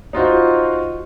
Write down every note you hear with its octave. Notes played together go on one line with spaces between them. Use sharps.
D#4 F4 F#4 C5